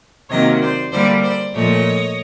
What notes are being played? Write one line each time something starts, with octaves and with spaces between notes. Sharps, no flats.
C3 D#3 F#3 A#3 C#5 D#5
C5 D5
D3 G3 A#3 C5 D5
C5 D5
A#2 F3 A3 C#5 D#5